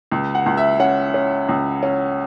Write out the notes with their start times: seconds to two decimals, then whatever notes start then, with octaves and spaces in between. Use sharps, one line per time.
0.12 C#2
0.35 F#5
0.46 C#2
0.57 E5
0.80 C#4 F#5
1.14 C#4
1.49 C#2
1.83 C#4